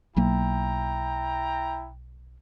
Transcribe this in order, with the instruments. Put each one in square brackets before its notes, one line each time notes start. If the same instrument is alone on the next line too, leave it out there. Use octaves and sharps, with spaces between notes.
[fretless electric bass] B1 F#3 A#3 [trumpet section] E4 G5 A#5